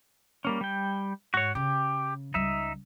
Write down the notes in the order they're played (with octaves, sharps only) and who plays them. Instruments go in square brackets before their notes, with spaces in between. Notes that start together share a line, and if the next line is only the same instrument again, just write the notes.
[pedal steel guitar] G3 A#3 C#4
G3 G5
[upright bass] G#2 [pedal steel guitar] F#4 C#5
[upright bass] C#3 [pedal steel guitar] G4
[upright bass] C#2 G3 [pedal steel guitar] D#4 E5